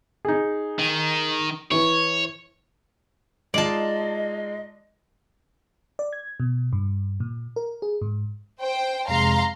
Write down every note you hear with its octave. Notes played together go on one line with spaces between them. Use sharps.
D#4 G#4
D#3
E3 C#5
G#3 D#4 F4 D5 D#5 A5
D5
G#6
B2
G2
A#2
A#4
G#4
G#2
C5 G5
F2 C3 G#3 F5 A#5 C6